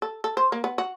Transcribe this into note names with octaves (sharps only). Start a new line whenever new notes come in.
A4
A4
C5
A#3
B3
F#4